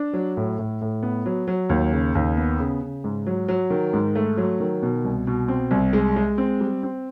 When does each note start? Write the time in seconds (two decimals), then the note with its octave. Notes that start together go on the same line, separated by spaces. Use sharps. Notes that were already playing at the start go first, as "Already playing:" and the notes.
Already playing: D4
0.13 F#3
0.37 A2
0.59 A2
0.81 A2
1.03 B3
1.26 F#3
1.47 F#3
1.69 D#2
1.92 C#3
2.15 D#2
2.37 B3
2.59 C#3
2.82 C#3
3.04 G#2
3.26 F#3
3.48 F#3
3.70 D#3
3.93 G#2
4.15 A3
4.37 F#3
4.60 D#3
4.83 B2
5.04 C2
5.27 B2
5.48 C4
5.71 C2
5.93 G#3
6.16 G#3
6.38 C4
6.61 G3
6.83 C4